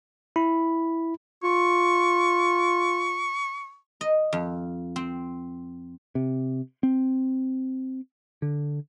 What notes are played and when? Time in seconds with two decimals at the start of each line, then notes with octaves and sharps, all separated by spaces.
0.36 E4 B5
1.43 F4 C#6
4.01 D#5
4.33 F2
4.96 C4
6.15 C3
6.83 C4
8.42 D3